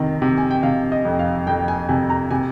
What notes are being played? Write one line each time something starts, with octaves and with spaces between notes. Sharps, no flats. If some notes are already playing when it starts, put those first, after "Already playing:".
Already playing: F2 C3 D#3
C3
G#5
G5
C3 F5
D#5
F2
F5
F2 G5
G#5
C3 G#5
A#5
C3 G#5